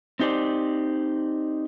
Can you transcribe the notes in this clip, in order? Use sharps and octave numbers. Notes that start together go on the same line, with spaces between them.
C4 D#4 G4 C5 D5